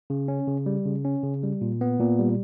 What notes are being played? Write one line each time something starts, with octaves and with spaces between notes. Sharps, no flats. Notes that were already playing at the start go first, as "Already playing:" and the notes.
C#3
C#4
C#3
G3
C#3
C#4
C#3
G3
A#2
B3
A#2
G3